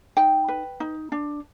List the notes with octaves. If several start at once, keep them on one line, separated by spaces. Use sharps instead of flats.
D#4 G5
B4
D#4
D4